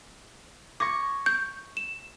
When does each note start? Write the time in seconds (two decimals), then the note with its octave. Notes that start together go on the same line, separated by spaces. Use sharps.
0.80 C#6 D6 G#6 A#6
1.26 G6
1.77 E7